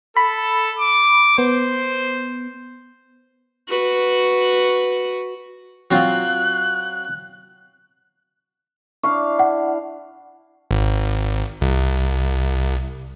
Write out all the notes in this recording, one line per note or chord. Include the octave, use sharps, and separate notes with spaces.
A4 B5
D6
B3 C5
F#4 B4
F#3 C4 F4 F#6
D4 E4 F5 C#6
F#5
G#1
C2